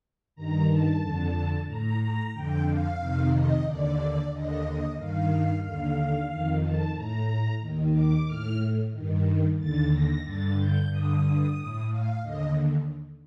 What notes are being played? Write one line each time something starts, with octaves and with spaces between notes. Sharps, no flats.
G2 D#3 A#5
A5
F2 D3
A2 A#5
A#5
F2 D3 G5
F5
F2 C3 D#3
D#5
D#2 D3 D5
D#2 D3 D#5
G2 D#3 F5
D#2 D3 F5
F2 D#3
A5
A2 A#5
D#2 D#3
D6
A2 F6
G2 D#3
D#2 D3 A6
A#6
G2 D3 A6
G6
G2 D3 D#6
D#6
A2
F5
D#2 D3 D#5